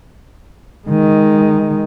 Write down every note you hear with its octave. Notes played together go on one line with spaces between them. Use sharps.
D#3 G#3